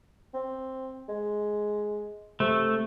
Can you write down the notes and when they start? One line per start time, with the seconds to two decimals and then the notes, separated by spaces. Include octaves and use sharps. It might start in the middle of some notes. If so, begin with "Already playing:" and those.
0.34 C4
1.08 G#3
2.40 C3 A3